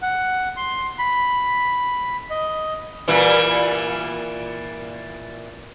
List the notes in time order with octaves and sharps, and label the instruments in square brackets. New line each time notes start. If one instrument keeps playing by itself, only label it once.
[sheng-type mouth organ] F#5
C6
B5
D#5
[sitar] A#2 E3 G3